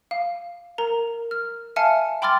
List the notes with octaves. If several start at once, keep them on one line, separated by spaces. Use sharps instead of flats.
F5
A#4 A#5
F6
E5 F5 G#5 A5 F6 C#7
G5 B5 C6 D6 F6 A6